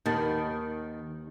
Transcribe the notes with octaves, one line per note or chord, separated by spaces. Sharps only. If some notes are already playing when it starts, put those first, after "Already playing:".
D#2 D#3 B3 A5